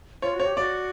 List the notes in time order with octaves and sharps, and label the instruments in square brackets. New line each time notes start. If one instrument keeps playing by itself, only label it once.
[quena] F4 [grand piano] C#5
[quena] F#4
[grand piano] C#5
[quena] G4
[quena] F#4 [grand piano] D5